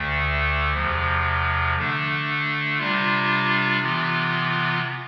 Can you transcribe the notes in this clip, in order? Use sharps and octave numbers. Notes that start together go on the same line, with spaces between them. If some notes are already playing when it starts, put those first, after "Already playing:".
Already playing: D2 D3 A3
E2 C3 F3
D3 A3 D4
C3 G3 D4 F4
C3 E3 B3 F4